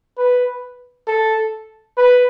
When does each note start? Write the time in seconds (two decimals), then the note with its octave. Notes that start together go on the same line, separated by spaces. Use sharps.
0.18 B4
1.08 A4
1.97 B4